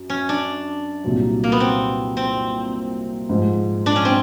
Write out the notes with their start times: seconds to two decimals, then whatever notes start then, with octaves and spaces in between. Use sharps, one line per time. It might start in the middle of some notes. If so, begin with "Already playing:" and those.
Already playing: F#2
0.10 C#4
0.29 D4
1.04 C2 A#2 F#3
1.44 A#3
1.52 B3
1.60 C4
2.17 C4
3.29 G#2 F3 G#3
3.86 D4
3.96 C#4
4.05 C4